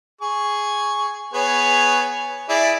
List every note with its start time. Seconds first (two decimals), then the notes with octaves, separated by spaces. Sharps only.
0.21 G#4 C#6
1.34 B3 G#4 C#5
2.49 E4 G#4 D5